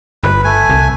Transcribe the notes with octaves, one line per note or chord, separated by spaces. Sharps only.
G1 B4
A3 G#5
C2